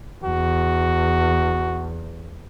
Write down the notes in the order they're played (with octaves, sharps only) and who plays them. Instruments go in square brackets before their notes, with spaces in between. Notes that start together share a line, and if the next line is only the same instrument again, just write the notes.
[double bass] E2 [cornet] F#4